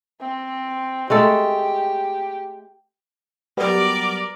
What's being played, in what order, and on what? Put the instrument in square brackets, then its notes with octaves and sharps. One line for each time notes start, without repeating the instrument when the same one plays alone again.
[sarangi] C4
[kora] G#3 A3 A4 [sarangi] G4
[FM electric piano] F#3 G3 B3 [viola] A#4 D5